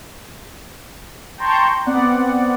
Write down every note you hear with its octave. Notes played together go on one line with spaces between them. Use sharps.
G5 A5 A#5 C6 C#6 G6
B3 C4 D5 F#5